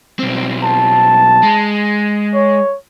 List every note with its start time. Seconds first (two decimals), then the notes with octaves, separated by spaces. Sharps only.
0.19 B1 C4
0.63 A5
1.43 G#3
2.34 C#5